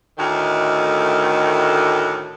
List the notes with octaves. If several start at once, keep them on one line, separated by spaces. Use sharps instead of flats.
D2 A2 D#3